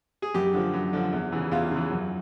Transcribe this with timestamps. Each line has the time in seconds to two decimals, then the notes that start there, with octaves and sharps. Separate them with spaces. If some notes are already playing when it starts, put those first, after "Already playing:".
0.22 G#4
0.34 F#2 G4
0.54 D3 F3
0.74 F#2
0.93 D3 F3
1.13 E2
1.32 C#3 E3
1.52 E2 F4
1.71 C#3 E3
1.91 F#2